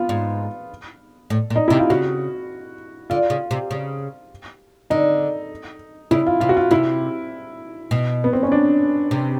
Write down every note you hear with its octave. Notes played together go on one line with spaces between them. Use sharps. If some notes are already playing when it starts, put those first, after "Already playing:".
Already playing: B3 F4
G#2
A2
A#2
D#4
C3 E4
F4
C#3 F#4
D3 F4
C#3
C3
C#3
D3 D#4
C#3 E4
F4
C3 F4
F#4
F4
C3 E4
B2
B3
C4
C#4
D4
C3